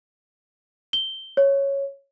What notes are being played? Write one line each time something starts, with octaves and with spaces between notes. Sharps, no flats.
G7
C#5